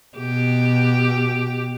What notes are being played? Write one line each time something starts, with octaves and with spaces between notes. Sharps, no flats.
B2 G4